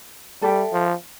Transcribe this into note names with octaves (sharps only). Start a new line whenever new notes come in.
G3 A4 E5 G5
F3